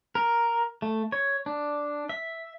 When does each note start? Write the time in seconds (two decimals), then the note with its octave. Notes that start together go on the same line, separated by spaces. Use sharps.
0.15 A#4
0.82 A3
1.12 C#5
1.46 D4
2.09 E5